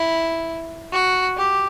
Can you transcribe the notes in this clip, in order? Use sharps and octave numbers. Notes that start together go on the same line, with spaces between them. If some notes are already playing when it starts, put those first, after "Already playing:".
Already playing: E4
F#4
G4